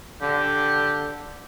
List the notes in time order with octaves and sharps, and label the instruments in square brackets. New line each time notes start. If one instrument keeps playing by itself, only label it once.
[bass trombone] D3 [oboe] G4